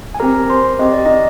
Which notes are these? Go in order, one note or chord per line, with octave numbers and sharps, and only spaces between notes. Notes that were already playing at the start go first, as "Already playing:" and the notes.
G#5
C4 G4 A#4 A#5
C5 C6
C4 G4 D#5
D5
D#4 D#5